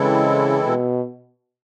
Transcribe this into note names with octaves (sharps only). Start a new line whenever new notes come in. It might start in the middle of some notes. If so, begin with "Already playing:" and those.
Already playing: C#3 E3 G#3 C4 E4 A4
B2